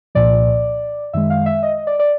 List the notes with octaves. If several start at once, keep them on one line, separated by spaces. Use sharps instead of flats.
C2 A#2 F3 D5
F#2 D#3 G#3 E5
F5
E5
D#5
D5
D5